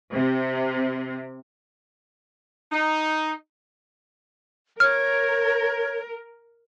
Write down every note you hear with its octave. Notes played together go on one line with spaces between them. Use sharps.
C3
D#4
A#4 C#5 F6